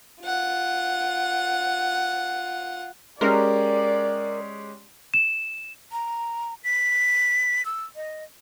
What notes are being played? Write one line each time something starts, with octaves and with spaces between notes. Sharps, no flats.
F4 F#5
G#3 C#4 G4 A#4 D5
E7
A#5
B6
E6
D#5